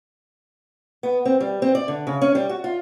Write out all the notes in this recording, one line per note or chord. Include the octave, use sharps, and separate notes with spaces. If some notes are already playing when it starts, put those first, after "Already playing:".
B3
C4
G3
C4
D5
D3
C#3
C#4
G3
F#4
F4